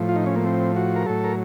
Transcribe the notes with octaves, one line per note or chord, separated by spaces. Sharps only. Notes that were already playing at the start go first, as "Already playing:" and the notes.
Already playing: A2 F3
F4
D#4
C#4
A#3
C4
F#4
A#4
A2 F#3 A4
A#4